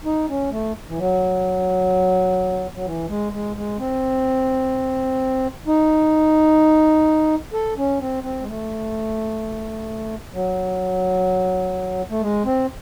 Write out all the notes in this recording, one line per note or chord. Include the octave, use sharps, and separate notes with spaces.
D#4
C#4
A3
E3
F#3
F#3
E3
G#3
G#3
G#3
C4
D#4
A4
C#4
C4
C4
G#3
A3
F#3
A3
G#3
C4